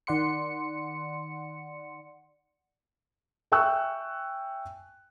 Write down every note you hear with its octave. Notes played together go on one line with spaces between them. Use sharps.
D#3 D5 F#5 C6 C#7
E5 G5 G#5 C#6 E6 F#6